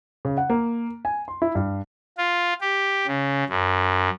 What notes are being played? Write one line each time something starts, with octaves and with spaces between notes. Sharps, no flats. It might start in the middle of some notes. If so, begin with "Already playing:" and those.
C#3
F#5
A#3
G#5
C6
E4
G2
F4
G4
C#3
F#2